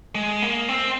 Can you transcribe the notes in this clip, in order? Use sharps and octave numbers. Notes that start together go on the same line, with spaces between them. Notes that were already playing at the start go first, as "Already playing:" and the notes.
G#3
A#3
C4